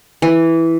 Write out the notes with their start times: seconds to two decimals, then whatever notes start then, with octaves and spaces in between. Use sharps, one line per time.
0.22 E3